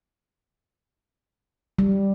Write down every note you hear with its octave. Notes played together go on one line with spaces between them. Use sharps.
G3